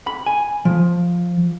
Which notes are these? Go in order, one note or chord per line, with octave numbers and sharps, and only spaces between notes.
B5
G#5
F3